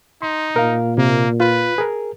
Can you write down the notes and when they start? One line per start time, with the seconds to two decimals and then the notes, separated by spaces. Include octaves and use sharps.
0.22 D#4 C6
0.56 A#2 A#4 F5
0.98 C3 A#3
1.40 F4 B4
1.78 G#4 A#4